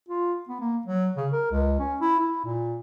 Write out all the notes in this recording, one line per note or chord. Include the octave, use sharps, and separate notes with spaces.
F4
B3
A#3
F#3
C#3
A#4
C#2
C#4
E4
E4
A#2